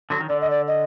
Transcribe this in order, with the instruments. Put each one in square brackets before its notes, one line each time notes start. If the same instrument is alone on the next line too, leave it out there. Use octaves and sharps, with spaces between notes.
[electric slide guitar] D3 F#3
D#3
[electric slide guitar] D3 [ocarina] D5
[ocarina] D#5
D5
D#5